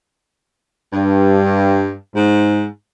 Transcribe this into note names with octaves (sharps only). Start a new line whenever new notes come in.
G2
G#2